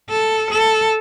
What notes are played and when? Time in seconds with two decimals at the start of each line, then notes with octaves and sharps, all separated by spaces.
0.10 A4
0.51 A4